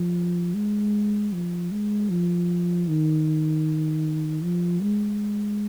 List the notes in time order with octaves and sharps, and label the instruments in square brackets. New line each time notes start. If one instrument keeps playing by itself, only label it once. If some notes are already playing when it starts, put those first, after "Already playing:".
Already playing: [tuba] F3
G#3
F3
G#3
F3
D#3
F3
G#3